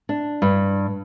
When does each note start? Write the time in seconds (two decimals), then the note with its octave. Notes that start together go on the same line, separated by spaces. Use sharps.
0.09 D4
0.42 G2